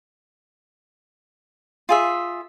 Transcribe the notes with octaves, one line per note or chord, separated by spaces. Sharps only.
F4 G#4 E5